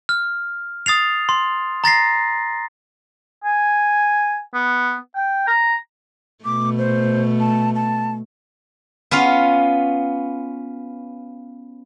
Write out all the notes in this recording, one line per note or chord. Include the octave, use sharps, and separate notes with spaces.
F6
D#6 A6 C7 F7
C6
A#5 A6 A#6 C7
G#5
B3
G5
A#5
B2 A3 D6
C5
A5
A5
B3 C#4 F4 F5